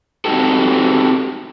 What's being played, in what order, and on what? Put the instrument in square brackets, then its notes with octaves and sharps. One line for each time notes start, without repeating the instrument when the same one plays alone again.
[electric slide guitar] C4 D#4 F#4 G4 A4